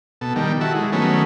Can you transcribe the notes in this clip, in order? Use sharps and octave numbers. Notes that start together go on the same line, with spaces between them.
B2 A4
D#3 G3
E4 F#4 A4
G#3
D#3 F#3 A3 B3 C#4